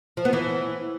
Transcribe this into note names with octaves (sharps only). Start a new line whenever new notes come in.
F3
B3
E3